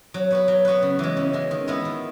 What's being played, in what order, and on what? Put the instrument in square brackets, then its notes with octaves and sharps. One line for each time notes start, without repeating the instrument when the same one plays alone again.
[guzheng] F#3
B3 F#4 B4
F#3
B3 F#4 B4
C#3
E3 G#3
C#3
E3 G#3
D#3
G#3 B3 E4
D#3